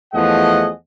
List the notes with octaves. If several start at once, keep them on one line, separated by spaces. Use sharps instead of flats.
E2 F3 A3 G#4 D#5 F#5